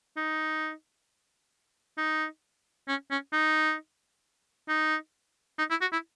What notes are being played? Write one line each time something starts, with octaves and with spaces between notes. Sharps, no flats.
D#4
D#4
C#4
C#4
D#4
D#4
D#4
E4
F#4
E4